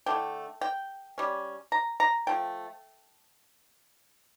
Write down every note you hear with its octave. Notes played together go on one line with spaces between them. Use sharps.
D3 A3 E4 G5
G5
G3 C#4
A#5
A#5
F3 A3 G5